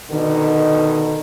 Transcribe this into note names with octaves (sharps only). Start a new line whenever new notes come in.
B2 D3 D#3